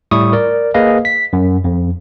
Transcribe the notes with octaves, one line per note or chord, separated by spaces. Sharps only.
A2 G3 E4 C#6 D#6
A#4 D5
A#3 G#4 B4 D#5 F5
B6
F#2
F2